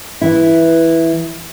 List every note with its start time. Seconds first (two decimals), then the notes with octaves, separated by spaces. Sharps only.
0.21 E3 E4